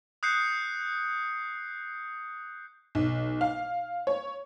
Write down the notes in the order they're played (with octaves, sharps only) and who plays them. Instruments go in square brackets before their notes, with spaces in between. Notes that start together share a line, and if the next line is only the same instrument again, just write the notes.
[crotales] D#6 F#6 G6 C7 C#7
[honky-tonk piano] B1
F5
C#5